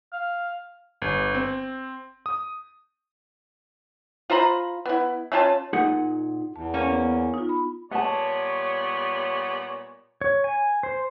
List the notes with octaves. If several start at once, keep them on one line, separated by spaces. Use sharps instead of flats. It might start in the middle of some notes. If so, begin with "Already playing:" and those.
F5
G1
C4
D#6
F4 C5 A#5 B5
B3 E4
A3 C#4 F4 A5
A#2 D#4 G#4 F#5
E2 A5
A#3 C#4
B3
D#4 F4
B5
A#2 G3 B3 C#5 F#5 A5
C#5
G#5
C5